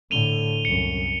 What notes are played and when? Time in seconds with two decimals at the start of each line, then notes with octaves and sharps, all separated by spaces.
0.11 A2 D3 D#7 F7 G7
0.65 C2 F#2 C#7